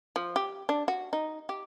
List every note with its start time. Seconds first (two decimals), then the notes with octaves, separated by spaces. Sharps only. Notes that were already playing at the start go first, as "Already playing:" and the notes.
0.16 F3
0.36 G4
0.69 D4
0.88 F#4
1.13 D#4
1.49 G4